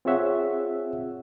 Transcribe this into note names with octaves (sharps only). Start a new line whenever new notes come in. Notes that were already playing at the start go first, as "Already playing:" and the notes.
C4 F4 G#4 C#5 E5 F#5